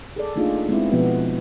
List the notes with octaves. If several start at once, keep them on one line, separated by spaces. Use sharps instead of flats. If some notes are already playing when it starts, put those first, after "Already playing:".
G#4 A4 D5
A3 A#3 D4 D#4 F4 G#4
G#3 B3 C4 E4
B2 F3 B3 F#4 B4